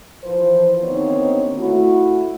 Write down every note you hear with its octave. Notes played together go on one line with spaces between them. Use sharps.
E3 F3 B4 C5
D#2 D3 B3 C4 D#4 C#5
A3 E4 F#4